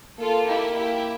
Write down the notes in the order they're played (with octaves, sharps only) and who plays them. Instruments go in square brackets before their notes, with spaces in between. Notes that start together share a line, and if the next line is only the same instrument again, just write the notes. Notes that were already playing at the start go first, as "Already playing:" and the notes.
[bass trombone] A#3 [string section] F4 A4
[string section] E4 G4
E4 G4